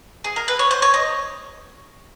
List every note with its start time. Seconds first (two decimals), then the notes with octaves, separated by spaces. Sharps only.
0.24 G#4
0.36 A#4
0.48 B4
0.59 C#5
0.71 C5
0.82 C#5
0.94 D#5